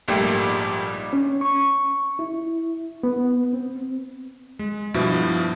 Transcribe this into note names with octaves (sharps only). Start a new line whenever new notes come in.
A#1 G#2 G3 A3 A#3 G4
C#4
C#6
E4
B3
C4
G#3
G2 B2 F3 E4